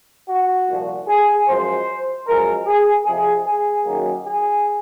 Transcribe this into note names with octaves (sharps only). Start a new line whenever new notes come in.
F#4
C2 A#2 F3
G#4
F#2 F3 G#3 C5
F#2 F3 G#3 A#4
G#4
F2 C3 F3 G#4
G#4
F#2 D#3 F#3 A#3
G#4